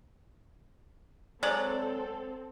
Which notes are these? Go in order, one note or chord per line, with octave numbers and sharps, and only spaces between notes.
F#3 G#3 C4 A4 D5